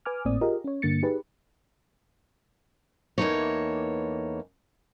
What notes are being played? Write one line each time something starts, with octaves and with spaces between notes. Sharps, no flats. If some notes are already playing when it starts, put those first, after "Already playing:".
B4 G#5 D6 F6
G#1 A2 A#3 C4 D5 D#6
F4 G4 G#4 A#4 D#5
C#4 C#5
G2 D3 A#3 A6 C#7
D#4 G4 G#4 B4
E2 E3 A#3 D#4 A4 C#5